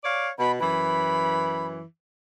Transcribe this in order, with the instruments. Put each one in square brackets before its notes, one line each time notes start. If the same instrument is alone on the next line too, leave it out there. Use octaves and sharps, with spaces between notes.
[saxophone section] C#5 D5 F5
[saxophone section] B2 [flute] B5
[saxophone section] F#2 E3 [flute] B5